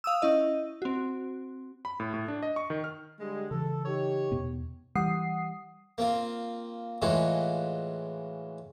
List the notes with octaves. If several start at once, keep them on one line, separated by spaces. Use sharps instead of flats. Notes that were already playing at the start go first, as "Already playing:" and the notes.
F5 D#6 E6
C#4 E4 D#5
C4 F#4
B5
A2
A2
D4
D#5
C#6
D#3
F6
D3 G3 G#3
C#3 E3 A4
D#4 G4 C#5
E2 B2 B3
E3 G3 F#5 D#6 C7
A#3 C4 F4
A2 E3 G#3 F4 F#4